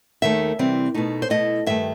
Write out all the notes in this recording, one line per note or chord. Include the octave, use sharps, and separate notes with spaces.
D#2 D#3 A3 E5
C3 E3 G3 C4
B2 A3 D#4
C5
B2 A3 E4 D#5
G2 D#3 A3 E5